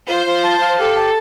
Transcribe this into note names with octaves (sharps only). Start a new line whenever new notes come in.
F4 C5
F4
A5
F5
G4 A4
A5